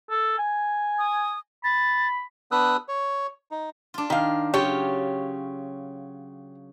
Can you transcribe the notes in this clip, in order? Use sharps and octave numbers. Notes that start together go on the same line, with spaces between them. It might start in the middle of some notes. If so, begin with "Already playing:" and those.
A4
G#5
D#6
B5 A6
B3 D4 B4 D#6 E6 F#6
C#5
D#4
D4 F4
D#3 F5
C#3 F#3 F4 G4 C#5